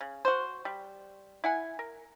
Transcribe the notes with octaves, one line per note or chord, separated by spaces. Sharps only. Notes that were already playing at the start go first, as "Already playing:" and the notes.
C#3
F#4 C5
G3
E4 F#5 G#5
A#4